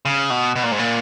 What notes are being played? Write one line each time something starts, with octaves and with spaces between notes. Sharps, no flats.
C#3
B2
B2
A#2
G#2
A#2